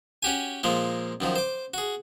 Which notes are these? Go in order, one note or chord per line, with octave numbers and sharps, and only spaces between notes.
C#4 F#4 G4 G#5
A#2 F3 G#3 A#3
F#2 D#3 F3
C5 D6
F#4 G#4